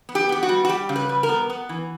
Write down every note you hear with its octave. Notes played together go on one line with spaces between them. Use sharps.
B3
G4
B3 G4
F#4
G3
F#4
G3 G4
C#3
B4
G3
A#4
B3
B3
E3